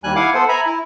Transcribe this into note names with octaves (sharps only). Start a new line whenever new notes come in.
D#2 G3 G#5 F#6
E4 F5 F#5 G#5 D6
B3 A4 C5 F#5
E5 G#5 A#5 B5
E4